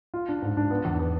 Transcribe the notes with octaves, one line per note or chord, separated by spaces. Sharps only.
F4
D4
G#2
D4
B3
E2
B3